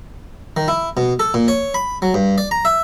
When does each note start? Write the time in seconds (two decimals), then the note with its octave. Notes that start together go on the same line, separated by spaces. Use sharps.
0.57 D#3
0.68 E4
0.97 B2
1.19 A4
1.34 A#2
1.48 C#5
1.74 B5
2.02 F#3
2.14 G2
2.38 D5
2.51 A#5
2.65 E5